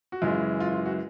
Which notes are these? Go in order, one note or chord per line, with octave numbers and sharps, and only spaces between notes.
F#4
F#2 C#3 E3 G#3 F4
F4
F4
F#4